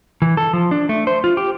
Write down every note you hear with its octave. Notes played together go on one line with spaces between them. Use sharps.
E3
A4
F3
D4
A3
C5
F4
G4